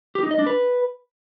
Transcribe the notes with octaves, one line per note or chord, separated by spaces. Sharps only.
G4
D#4
D#5
D4
B4